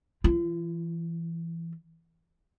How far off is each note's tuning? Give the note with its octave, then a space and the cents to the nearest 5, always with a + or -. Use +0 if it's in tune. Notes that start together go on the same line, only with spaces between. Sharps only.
E3 +15 F4 -40